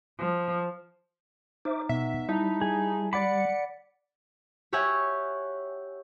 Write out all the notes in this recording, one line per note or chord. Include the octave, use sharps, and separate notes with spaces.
F3
D#4 C5 E5 D6
B2 B3 D#4 E5
G3 D#4 E4 E5 A5
G#4
D5 F#5 B5 D6 C#7
G4 C#5 E5 F#5 G#5